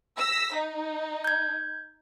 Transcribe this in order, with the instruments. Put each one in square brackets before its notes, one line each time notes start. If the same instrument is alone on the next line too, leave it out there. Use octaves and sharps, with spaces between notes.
[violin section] E6 A#6 B6
D#4
[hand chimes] G6 G#6